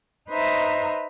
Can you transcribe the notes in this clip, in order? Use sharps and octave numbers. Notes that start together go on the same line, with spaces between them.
D#4 B4 C5 D#5 E5 A#5